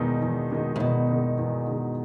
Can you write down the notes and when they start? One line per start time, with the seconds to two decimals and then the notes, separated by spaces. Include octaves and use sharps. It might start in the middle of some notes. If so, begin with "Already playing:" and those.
Already playing: E2 B2 D#3 G#3 D#4
0.22 E2
0.51 D#3 G#3 D#4
0.76 A2
0.79 E2 B2
1.09 D#3 G#3 D#4
1.38 E2
1.67 D#3 G#3 D#4